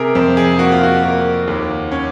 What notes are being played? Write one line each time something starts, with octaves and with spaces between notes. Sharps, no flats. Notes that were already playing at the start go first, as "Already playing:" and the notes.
Already playing: C3 G#4 A#4
F2 C5
G#4
A#3 F#4
F4
F#4
A#3
D#2
C#4